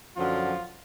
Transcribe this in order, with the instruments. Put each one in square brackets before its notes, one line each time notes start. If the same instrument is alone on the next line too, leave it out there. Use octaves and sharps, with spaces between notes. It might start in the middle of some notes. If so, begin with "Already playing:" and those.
[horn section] F#2 D3 F3 F#3 F4